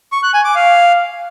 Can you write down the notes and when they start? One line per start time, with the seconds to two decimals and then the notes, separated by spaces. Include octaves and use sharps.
0.12 C#6
0.23 F#6
0.34 G#5
0.44 D6
0.55 F5